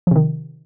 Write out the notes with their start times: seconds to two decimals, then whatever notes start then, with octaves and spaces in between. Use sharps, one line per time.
0.07 F3
0.11 C3
0.16 D#3